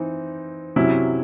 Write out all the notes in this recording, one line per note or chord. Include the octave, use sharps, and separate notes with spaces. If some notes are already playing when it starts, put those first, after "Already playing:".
Already playing: E3 C4 D#4
C3 F#3 C#4 E4